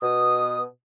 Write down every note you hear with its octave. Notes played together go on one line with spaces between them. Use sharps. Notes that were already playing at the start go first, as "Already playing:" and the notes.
B2 D#6